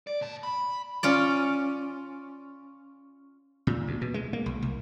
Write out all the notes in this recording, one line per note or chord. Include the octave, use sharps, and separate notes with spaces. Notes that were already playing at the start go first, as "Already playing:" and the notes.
D5
A#2 A5
B5
C#4 F4 D5
A#2
D2
B2
G#3
A#3
B1
C2